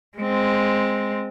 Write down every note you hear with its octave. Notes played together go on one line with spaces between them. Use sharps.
G#3 C4